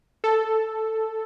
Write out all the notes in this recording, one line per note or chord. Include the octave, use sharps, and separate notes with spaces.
A4